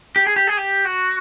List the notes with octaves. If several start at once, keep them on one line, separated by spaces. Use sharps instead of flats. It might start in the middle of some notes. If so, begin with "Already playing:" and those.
G4
G#4
G4
G#4
G4
F#4